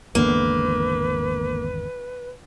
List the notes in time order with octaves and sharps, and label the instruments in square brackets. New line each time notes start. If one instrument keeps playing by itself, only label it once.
[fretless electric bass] G#1 E2 D3 [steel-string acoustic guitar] A#3 [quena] B4